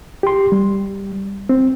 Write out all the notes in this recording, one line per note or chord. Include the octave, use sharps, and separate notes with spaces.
G4 C6
G3
C4